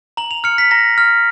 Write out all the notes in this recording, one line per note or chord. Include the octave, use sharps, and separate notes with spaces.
A#5 F#7
F7
F6 C#7
B6
A#5 A#6
F6